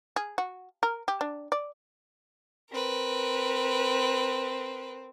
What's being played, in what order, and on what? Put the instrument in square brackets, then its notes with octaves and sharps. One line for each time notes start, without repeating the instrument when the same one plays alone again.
[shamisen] G#4
F#4
A#4
G4
D4
D5
[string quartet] C4 [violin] A#4 B4